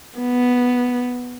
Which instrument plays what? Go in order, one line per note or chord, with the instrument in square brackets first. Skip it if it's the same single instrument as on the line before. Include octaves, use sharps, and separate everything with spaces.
[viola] B3